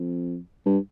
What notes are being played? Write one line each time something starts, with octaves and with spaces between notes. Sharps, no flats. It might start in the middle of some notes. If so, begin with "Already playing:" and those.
Already playing: F2
G2